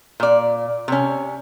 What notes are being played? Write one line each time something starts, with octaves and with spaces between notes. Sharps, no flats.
A#2 D5
C3 C#4